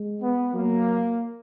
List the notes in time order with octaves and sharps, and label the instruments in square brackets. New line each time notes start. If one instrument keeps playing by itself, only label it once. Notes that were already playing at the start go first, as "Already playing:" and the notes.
Already playing: [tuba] G#3
[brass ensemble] B3
[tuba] F#3 [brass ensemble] A#3